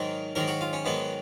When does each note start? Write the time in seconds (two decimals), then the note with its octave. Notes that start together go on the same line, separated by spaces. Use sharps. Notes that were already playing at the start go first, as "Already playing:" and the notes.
Already playing: G#2 D#3 F#3 A#4
0.35 G#2 D#3 F#3 A#4
0.48 F#4
0.61 F4
0.73 C#4
0.85 G#2 D#3 F#3 B3